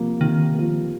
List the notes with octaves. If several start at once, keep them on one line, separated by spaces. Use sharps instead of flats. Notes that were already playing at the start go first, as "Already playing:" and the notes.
Already playing: C3 F3 A#3
C3 D#3
F3 A#3